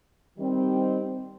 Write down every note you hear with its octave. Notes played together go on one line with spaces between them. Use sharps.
D#3 G3 C4